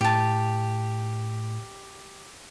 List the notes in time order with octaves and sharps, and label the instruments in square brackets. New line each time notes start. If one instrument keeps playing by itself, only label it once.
[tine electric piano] A2 [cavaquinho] G4 A5